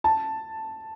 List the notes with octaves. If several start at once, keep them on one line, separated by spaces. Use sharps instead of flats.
A5